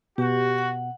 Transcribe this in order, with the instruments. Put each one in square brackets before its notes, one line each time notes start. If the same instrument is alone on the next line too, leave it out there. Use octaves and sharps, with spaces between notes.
[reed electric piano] B2 [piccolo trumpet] F#4 [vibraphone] G4
[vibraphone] F#5